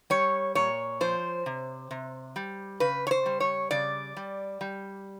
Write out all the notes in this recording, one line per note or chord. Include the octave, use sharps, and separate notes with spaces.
G3 C#5
A#2 C#5
F3 C5
C3
C3
G3
C#3 B4
C#5
C5
G3
C#5
C#3 D5
G3
G3